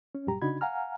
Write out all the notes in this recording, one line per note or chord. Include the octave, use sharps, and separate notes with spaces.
C#4
C2 F#2 A#2 G3 G4 A#5
C#3 D4 D#4 F#4 B5 G#6
F5 F#5 G#5 A#5 F6